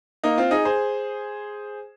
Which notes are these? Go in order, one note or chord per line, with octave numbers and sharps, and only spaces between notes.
A#3 D#4
C4 F4
D#4 G#4
G#4 C5